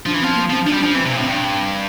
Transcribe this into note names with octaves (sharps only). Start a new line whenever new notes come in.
F3 D4
E3
F3 C4
A#3
F3 C4
F3 D4
G3
D4
F3
E3 C4
C3
A#2
A2
G2